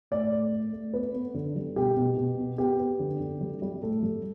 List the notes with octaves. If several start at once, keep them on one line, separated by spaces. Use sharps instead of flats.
A2 D5
A3
A3
A3
B3 B4
B3
D3
G3
B2 G4
B2
B2
B3
B3 G4
B3
D3
D3
G3
G3
A2 A4
G3